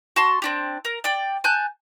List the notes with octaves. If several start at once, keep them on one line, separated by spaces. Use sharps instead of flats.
F#4 A5 C6
C4 D4 G4
A#4
D5 G5
G#5 A5 F#6 G6